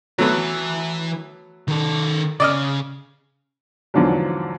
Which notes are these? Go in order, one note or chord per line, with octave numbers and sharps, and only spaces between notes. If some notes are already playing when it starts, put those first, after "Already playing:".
E3 F#3 A3 B3 B4
D#3 A4
C#3 D5 D#5 F6
E2 G#2 D3 F3 F#3